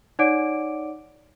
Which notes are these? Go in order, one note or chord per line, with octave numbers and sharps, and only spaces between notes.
D#4 C#5 D5 F#5 D6 D7